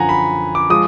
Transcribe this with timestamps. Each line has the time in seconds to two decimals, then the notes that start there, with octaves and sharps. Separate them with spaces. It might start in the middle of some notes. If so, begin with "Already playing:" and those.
Already playing: F#2 D3 F3 F#5 G#5 A#5
0.09 B5
0.55 D6
0.70 F3 G#3 D#6